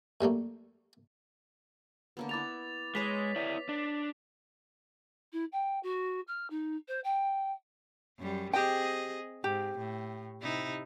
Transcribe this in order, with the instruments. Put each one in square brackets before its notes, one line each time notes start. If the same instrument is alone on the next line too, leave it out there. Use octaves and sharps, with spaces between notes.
[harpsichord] F#2 G3 A3 A#3
[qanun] D3 A#3 B3
[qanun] E4 B4 [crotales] D6 A6 F7
[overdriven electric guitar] G#3 [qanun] B4 C#5 D#5 [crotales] B6 F7
[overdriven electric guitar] E4 D5
D4
[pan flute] E4
G5
F#4
F6
D#4
C5
G5
[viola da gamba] F#2 G3
[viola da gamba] C4 G#4 D#5 [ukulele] G4 G5
[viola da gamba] G#2 [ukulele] G4
[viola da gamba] A2
C3 D#4 E4